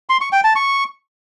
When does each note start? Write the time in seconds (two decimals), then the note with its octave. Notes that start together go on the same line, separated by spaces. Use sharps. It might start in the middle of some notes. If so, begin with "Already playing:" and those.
0.09 C6
0.21 C#6
0.32 G5
0.44 A5
0.56 C#6